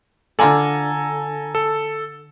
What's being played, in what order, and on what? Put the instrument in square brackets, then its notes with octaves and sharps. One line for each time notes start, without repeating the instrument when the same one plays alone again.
[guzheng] D3 F4 D5 [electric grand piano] A4 G#5 A#5
[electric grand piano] A4